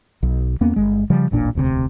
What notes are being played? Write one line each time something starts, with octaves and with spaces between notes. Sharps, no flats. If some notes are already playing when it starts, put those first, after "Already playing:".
B1
E2 A#3 B3 C#4
G1 G#3
C#3 F3 G3
D#1 A1 A#2 D4
E1 D2 G#2 C3